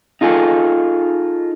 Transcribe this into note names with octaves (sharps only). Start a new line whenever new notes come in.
D#4 F4 G#4 A4